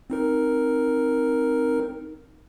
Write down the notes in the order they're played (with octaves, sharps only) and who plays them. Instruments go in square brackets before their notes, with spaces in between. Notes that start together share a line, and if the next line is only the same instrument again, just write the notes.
[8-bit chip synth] C4 D#4 A#4